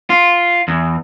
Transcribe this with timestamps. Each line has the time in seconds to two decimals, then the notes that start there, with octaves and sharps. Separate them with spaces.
0.10 F4
0.68 E2